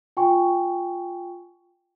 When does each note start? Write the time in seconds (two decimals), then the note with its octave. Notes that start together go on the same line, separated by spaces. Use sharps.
0.17 F4 G5 G#5 C#6